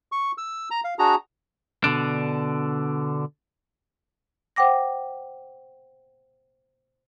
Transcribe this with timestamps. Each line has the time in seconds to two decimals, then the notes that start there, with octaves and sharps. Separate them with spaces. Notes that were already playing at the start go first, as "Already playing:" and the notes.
0.12 C#6
0.38 E6
0.71 A#5
0.84 F5
0.99 D4 F#4 G#4 A#5
1.84 B2 D3 D4
4.56 C5 F#5 G5 D6 A#6